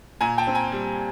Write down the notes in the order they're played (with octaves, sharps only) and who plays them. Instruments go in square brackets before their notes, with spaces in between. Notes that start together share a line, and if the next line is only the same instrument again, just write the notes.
[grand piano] A#2 G#5 A#5
G5 A5
C4
G#5 A#5
G3